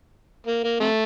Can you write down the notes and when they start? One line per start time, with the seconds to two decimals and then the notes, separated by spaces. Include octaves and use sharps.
0.47 A#3
0.64 A#3
0.80 C3 A3